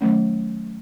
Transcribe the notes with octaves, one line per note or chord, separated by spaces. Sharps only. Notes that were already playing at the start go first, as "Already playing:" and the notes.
D#3 F#3 A3 C#4